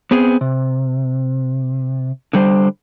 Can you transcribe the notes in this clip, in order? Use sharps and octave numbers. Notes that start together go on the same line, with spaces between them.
B3 C4 G#4
C3
D3 G3 C5